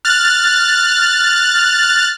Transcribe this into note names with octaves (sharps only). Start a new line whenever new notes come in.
F6 F#6 A6